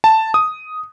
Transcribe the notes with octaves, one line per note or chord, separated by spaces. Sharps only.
A5
D#6